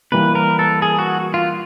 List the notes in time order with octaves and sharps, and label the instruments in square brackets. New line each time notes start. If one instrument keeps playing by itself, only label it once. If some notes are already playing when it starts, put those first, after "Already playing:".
[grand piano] E3 G3 A#3 [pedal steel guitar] B4
[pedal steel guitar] A#4
A4
G#4
F#4
F4